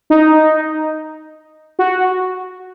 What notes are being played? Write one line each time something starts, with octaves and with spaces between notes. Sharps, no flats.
D#4
F#4